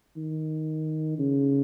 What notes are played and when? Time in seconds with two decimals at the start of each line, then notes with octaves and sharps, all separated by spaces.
0.16 D#3
1.18 C#3